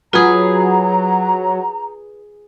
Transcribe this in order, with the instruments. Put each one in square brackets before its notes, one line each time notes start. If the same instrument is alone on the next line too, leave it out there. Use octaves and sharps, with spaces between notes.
[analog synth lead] F#3 [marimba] F4 [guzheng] G#4 B4 [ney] A#5